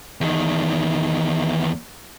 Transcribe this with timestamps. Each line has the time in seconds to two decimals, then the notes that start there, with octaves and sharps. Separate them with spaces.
0.21 E2 D#3